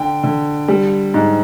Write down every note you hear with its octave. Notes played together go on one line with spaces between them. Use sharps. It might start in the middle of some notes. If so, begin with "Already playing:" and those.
Already playing: D3 G5
D3
G3
G#2